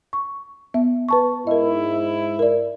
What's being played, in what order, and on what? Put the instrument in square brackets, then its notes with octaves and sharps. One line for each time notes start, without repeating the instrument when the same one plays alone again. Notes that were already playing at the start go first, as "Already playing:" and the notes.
[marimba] C#6
B3 E5
B4 A5 C#6
[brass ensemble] G#2 E4 [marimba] A#4 D#5
[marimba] A#4 D5